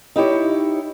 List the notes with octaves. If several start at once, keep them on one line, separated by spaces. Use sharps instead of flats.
D#4 E4 G4 C#5